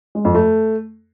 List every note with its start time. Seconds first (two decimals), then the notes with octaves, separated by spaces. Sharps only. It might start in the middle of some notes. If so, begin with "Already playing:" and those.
0.15 G#3
0.25 F2
0.35 A3